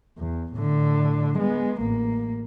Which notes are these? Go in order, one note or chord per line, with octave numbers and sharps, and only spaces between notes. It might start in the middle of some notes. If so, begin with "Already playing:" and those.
E2
A2 D3
G#3 B3
A1 A#3